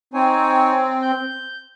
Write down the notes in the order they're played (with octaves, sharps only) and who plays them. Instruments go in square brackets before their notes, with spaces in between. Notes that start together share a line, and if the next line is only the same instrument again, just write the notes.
[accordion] C4 [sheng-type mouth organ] D#4 C#5 G#5
[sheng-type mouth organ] G6